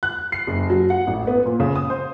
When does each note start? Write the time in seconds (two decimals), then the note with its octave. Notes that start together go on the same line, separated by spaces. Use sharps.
0.03 F#6
0.32 C7
0.47 F#1
0.70 F#3
0.90 F#5
1.07 A1
1.27 B3
1.46 A#2
1.60 C#3
1.76 D#6
1.90 C5